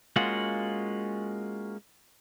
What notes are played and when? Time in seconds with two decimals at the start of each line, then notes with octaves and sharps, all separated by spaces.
0.16 G#3 A#3 C#4 F4 F#4